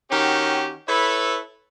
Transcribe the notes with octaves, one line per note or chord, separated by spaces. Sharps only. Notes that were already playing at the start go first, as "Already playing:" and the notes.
D#3 C#4 F#4 G4
E4 A4 B4 C#5